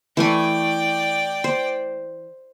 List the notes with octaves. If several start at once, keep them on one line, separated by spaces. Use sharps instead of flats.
E3 A3 D5 G5 G#5
C5